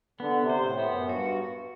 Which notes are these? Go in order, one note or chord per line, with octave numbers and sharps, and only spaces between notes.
D3 B3
C3
C5
A2
B3
F#2
G2 F#4